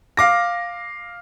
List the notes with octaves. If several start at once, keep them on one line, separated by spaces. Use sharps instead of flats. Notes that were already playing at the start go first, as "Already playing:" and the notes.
F5 D6 A#6